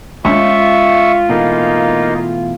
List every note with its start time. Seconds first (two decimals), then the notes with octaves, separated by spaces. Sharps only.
0.25 G#3 C#4 F4 E5 C#6
1.29 B2 E3 A3 A#3 D#4